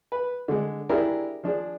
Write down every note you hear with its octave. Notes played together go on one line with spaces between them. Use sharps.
B4
D3 G#3
D4 E4 G4 G#4 A#4
F3 D4 G#4